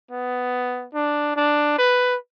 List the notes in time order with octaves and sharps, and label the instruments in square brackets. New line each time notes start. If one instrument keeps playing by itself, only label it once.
[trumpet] B3
D4
D4
B4